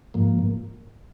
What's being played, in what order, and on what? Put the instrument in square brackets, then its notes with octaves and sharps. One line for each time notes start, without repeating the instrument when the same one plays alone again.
[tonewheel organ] G#2 F3 A#3